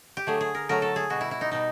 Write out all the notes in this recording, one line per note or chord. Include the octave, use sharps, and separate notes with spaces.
G4
D3 F#3 A3 G#4
G#4
A#4
D3 F#3 A3 A#4
A4
G#4
B2 G3 F#4
E4
E4
D#4
B2 G3 D#4